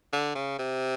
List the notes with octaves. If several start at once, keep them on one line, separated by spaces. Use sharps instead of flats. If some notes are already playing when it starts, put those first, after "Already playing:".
D3
C#3
C3